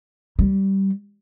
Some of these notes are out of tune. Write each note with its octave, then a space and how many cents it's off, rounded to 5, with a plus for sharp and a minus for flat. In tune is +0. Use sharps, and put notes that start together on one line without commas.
G3 -15